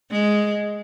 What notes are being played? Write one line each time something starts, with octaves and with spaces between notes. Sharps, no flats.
G#3